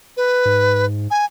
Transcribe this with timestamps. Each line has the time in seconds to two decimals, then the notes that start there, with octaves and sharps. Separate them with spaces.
0.17 B4
0.45 G#2
1.11 G#5